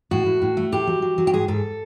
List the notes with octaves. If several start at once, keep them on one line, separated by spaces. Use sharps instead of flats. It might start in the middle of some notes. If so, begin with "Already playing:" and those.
A2 F#4
A2
A2
A3
A2 G4
F#3
F#3
F#3
G4
G#2 G#4
G#2 A4